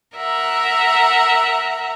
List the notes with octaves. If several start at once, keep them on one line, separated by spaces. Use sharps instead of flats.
A#4 E5 F#5 A#5